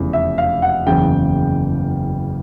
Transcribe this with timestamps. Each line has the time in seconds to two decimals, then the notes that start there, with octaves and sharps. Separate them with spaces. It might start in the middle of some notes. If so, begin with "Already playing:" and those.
Already playing: F1 E2 C#3 E3
0.13 E5
0.38 F5
0.62 F#5
0.87 F#1 E2 C#3 G5